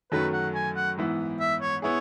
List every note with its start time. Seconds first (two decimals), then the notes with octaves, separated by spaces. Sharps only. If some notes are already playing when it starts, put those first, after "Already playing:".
0.12 F#2 D#3 F#3 A3 C#4 B4
0.33 F#5
0.55 G#5
0.76 F#5
0.97 G#2 E3 B3 E4
1.40 E5
1.61 C#5
1.82 B3 E4 G#4 C#5